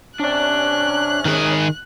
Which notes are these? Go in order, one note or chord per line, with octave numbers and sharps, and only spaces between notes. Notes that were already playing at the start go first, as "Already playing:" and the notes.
C3 C#4 D4 D5 F#6
D#3 G#4